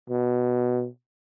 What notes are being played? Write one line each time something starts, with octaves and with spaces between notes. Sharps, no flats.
B2